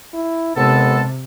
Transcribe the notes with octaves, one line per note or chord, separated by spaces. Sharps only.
E4
D#2 C3 G#3 B3 A4